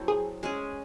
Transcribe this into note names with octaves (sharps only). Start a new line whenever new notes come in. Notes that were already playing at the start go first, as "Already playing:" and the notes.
Already playing: F#3 C4 E4 A4
G#4
G#3 C#4 G#4